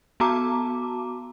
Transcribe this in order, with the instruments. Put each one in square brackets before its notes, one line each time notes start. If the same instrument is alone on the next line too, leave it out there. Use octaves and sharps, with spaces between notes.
[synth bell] B3 F#4 A5 A#5 D6